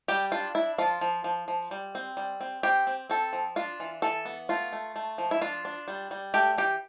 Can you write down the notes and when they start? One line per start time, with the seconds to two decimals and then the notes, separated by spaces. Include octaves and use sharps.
0.08 G3 G4
0.32 D4 F4
0.55 D4 E4
0.78 F3 F4
1.01 F3
1.24 F3
1.48 F3
1.71 G3
1.95 C4
2.17 G3
2.41 C4
2.63 C4 G4
2.87 C4
3.10 C4 A4
3.33 F3
3.56 D4 F4
3.80 E3
4.02 E3 A4
4.25 B3
4.49 A3 F4
4.73 A3
4.96 A3
5.18 F3
5.31 E4
5.42 D4 F4
5.65 D4
5.88 G3
6.11 G3
6.34 A3 G4
6.57 E3 G4